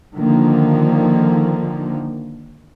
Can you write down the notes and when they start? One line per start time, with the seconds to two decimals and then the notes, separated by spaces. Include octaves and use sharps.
0.15 D3 D#3 F3 A#3